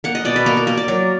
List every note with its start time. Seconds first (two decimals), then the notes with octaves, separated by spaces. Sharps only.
0.04 A#3 F#5
0.15 D#5
0.25 B2 D5
0.36 B4
0.46 A#3 A#4
0.57 A#4
0.67 A#3 A#4
0.77 D5
0.88 F#3 A#4